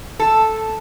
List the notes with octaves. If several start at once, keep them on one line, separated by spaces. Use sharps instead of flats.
A4